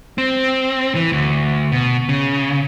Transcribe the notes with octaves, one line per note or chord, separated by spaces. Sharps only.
C4
E3
D2
B2
C#3